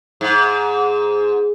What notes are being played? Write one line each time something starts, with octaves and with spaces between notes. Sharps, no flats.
G#2